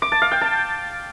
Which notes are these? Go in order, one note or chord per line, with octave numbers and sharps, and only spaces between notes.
D6
A5
F5
G5
A5